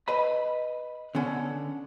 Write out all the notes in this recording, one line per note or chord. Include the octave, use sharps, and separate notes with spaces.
B4 D#5 B5
D3 B3 C#4 A4